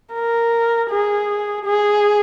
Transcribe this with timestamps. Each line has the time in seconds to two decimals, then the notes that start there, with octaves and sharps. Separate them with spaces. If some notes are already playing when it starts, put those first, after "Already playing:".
0.14 A#4
0.90 G#4
1.66 G#4